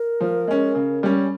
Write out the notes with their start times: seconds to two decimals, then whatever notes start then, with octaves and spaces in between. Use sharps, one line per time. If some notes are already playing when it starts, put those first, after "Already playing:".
Already playing: A#4
0.21 F3
0.47 G#3 C#4
0.75 C#3
1.03 G3 C#4